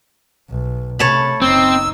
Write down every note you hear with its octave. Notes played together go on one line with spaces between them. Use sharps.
B1
C3 A3 C#5 A5 B5
F#1 C4 D#4 E6